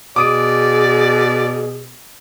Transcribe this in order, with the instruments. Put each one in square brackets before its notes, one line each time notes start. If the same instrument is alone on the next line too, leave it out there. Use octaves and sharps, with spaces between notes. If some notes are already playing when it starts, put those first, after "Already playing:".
[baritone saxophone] B2 [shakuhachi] G#4 [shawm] D5 [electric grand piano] D6 D#6 D7